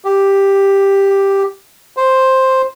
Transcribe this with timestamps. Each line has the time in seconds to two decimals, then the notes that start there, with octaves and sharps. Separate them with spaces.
0.05 G4
1.97 C5